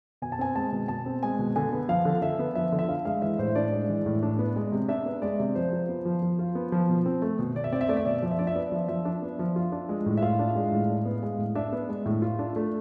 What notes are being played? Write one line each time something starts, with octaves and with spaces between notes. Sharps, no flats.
B2 G#5
A5
C4 G#5
G#3 A5
B2
B2 A5
C4
G#3 G#5
B2
D3 G#5
B3
F3 F5
D3
D3 E5
B3
F3 E5
D3
E5
D4 F5
G#3 F5
E3 E5
A2 C5
D4 D5
G#3
E3
A2
D4
B3
G#3
C3
D4 E5
B3
G#3 D5
C3
F3 C5
F4
B3
F3
F3
F4
B3
F3
B2
C4
A3
B2
B2 D5
E5
C4 D5
E5
A3 D5
E5
B2 D5
E5
F3 D5
E5
D4 D5
E5
B3 D5
F3
F3 E5
D4
B3
F3
F4
D4
G#3
A2
E5
F4 F5
D4
G#3
A2
D4
B3
G#3
A2
D4 E5
B3
G#3
A2
F4
D4
A3